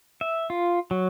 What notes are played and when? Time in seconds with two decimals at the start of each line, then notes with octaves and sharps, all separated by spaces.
0.21 E5
0.50 F4
0.91 F#3